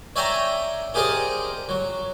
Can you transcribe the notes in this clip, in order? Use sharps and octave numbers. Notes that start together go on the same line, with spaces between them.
C#5 D5 E5 G5 G#5 A#5
G4 G#4 A#4 C5 D5 D#5
F#3